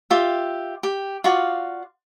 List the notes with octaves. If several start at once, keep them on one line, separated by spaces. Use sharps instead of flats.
F4 G4 E5
G4
F4 F#4 D5 F5